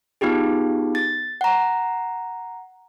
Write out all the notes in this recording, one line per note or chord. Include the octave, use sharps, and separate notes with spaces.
B3 D#4 F4 G4 G#4
A6
F#5 A#5